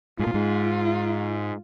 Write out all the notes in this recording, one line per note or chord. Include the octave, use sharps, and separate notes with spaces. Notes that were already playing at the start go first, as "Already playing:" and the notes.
G#2 F4
A#2
G#2